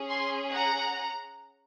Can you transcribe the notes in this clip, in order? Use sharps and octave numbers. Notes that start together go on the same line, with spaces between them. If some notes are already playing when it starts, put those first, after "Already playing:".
Already playing: C#4 G#4
G#5 C6
F#5 A#5